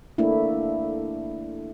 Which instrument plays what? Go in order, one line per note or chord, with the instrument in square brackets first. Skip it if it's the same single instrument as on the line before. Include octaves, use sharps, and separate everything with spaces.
[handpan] A3 A#3 D4 E4